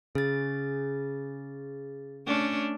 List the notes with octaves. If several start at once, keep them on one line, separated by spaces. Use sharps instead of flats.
C#3 G#4 A6
A3 C#4 D4